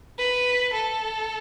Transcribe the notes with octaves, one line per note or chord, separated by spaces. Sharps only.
B4
A4